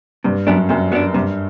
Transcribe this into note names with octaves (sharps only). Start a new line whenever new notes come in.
G2 C3
F#2 F#3 B3 D4
F#2 C3
F#3 B3 D4
G2 C3